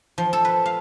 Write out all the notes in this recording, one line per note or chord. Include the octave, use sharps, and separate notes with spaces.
F3
A4
B4
F5